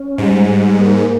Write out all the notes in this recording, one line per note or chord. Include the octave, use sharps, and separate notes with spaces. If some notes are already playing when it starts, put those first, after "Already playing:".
Already playing: C#4
G#2 G3
G3
A#3